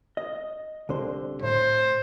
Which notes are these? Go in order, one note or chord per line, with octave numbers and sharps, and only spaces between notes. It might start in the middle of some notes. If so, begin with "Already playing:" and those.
D#5
C2 D3 C5
A2 C5